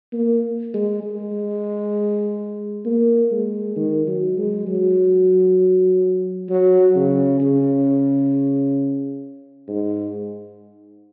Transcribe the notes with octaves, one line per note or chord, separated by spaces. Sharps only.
A#3
G#3
G#3
A#3
G#3
D#3
F#3
G#3
F#3
F#3
C#3
C#3
G#2